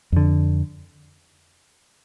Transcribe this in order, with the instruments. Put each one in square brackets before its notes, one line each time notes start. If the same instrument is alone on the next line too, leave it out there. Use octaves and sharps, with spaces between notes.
[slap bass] F2 D3